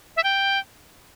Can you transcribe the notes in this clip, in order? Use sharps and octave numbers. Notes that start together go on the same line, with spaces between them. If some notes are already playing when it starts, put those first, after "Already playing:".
E5
G5